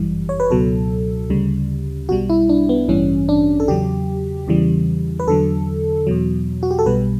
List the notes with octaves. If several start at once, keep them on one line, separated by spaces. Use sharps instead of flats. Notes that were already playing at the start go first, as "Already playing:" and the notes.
Already playing: G1 F#2 E3 G3
C#5
B4
C#2 B2 F#3 A4
D2 C#3 G3
B1 B2 G3 F#4
E4
D4
B3
A1 G2 E3 G3 C#4
D4
A4
E2 C#3 F#3 G4
E2 C#3 E3 G3
B4
E2 D3 F#3 A4
E2 B2 F#3
F#4
G4
A4
B1 B2 G3 B4